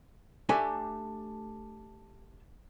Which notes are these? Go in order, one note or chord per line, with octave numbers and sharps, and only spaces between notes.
A3 D4 G4 A4 E5 G#5